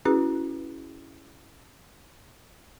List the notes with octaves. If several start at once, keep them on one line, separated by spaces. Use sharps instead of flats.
C#4 E4 F#4 G#4 B4